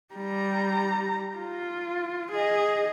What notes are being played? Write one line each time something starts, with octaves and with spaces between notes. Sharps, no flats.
G3 A#5
F4
G#4 D#5